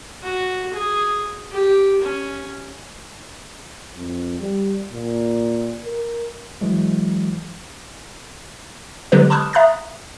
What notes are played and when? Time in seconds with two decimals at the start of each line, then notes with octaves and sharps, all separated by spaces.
0.23 F#4
0.73 G#4
1.52 G4
2.02 C#4
3.95 F2
4.39 G3
4.92 A#2
5.84 A#4
6.61 E3 F#3 G#3
9.12 D3 F#3 G#3 B3 G4 B4
9.30 A5 B5 C#6 D#6 F6 F#6
9.53 E5 A#5 D#6 F#6 A6